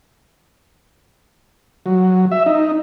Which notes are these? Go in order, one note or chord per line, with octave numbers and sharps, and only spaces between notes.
F#3
E5
D#4